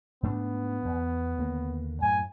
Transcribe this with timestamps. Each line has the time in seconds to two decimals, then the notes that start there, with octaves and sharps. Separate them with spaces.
0.23 G#2 A3 B3 D4
0.85 E2
1.38 D#2 D3 A#3
2.02 F#2 A2 G#5